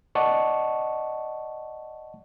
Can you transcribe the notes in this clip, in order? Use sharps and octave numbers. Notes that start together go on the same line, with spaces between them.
D5 D#5 F#5 A5 C#6